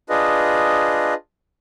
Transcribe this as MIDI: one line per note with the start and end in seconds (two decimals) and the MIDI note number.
0.10 1.14 62
0.10 1.14 65
0.10 1.14 68
0.10 1.14 71
0.10 1.14 75